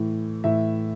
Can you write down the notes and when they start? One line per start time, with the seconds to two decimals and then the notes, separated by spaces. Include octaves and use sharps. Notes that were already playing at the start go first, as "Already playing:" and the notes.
Already playing: A2 E3
0.44 A2 E3 E5